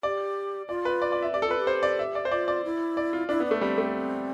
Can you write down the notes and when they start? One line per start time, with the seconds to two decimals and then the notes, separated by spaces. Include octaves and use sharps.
0.03 G4 D5
0.69 F4 D5
0.85 B4
1.02 D5
1.12 D5
1.22 E5
1.34 G4 D5
1.42 A4
1.46 F4 B4
1.58 G4
1.67 C5
1.83 D5
1.99 E5
2.15 D5
2.25 C5
2.31 F4 D5
2.48 D5
2.65 E4
2.97 D5
3.13 F4
3.29 D4 E4
3.40 B3
3.46 D4
3.51 A3
3.61 G3 C4
3.78 A3